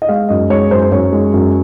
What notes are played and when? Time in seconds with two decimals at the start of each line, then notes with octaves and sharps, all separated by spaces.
0.02 D#5
0.08 G#3 F5
0.29 F#2 D#5
0.50 G#3 C#5
0.71 F#2 C5
0.82 C5
0.91 F#2 C#5
1.13 G#3
1.34 F#2